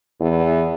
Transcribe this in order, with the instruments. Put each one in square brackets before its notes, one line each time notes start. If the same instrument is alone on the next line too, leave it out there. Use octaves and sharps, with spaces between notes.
[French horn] E2